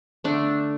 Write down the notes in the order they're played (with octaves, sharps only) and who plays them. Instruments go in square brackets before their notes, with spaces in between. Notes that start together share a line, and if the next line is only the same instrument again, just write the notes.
[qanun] D3 A3 D4